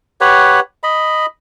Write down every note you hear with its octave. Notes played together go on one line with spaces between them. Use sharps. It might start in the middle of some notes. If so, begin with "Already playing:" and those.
G4 B4 C#5 F#5
D#5 B5